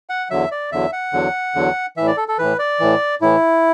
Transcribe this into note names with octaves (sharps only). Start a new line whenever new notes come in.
F#5
E2 D3 F#3 E5
D5
E2 D3 F#3 E5
F#5
E2 D3 F#3
E2 D3 F#3
A2 E3 E5
D5
A4
A4
A2 E3 B4
D5
A2 E3
A2 E3 E4